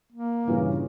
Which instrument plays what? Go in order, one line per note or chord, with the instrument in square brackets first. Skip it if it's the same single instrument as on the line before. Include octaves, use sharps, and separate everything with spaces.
[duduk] A#3
[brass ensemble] G2 C#3 [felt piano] A#2 E3